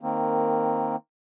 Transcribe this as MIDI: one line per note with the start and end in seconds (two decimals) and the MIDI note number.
0.01 0.96 51
0.01 0.96 58
0.01 0.96 60